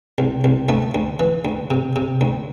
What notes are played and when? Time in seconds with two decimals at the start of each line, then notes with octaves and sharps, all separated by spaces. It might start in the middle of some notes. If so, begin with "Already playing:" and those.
0.18 C2
0.44 C2
0.69 D2 A3
0.95 D2
1.20 E3
1.45 D2
1.71 C3
1.96 C3
2.21 D2